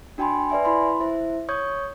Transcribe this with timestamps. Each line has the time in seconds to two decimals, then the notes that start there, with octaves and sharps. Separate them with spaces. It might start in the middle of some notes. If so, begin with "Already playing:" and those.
0.18 D4 F#4 G5 G#5 B5 C6
0.50 B4 D5 E5 G#5
0.65 E4 B5 C6
1.00 E4 C5 E5
1.49 C#5 C#6 D#6 G6 G#6